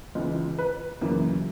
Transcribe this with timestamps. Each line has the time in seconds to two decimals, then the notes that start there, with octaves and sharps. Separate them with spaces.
0.15 C#2 C#3 E3
0.58 B4
1.01 F#2 C#3 E3 A#3